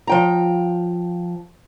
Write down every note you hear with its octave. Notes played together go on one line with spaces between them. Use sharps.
F3 G5 A#5